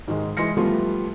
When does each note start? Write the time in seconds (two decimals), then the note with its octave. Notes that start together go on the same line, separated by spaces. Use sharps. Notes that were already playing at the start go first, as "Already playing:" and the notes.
0.08 G#2 D#3 G#3
0.37 E3 G#3 C6 A#6 C#7
0.57 E3 F3 G3 A3 B3 F4